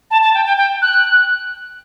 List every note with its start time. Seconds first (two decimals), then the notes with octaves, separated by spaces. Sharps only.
0.11 A5
0.22 A5
0.34 G5
0.45 G5
0.57 G5
0.82 F#6